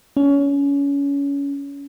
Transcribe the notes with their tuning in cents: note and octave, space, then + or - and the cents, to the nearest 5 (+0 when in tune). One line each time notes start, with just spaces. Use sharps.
C#4 +25